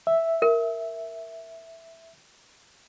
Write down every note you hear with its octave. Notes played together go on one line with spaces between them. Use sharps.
E5
A#4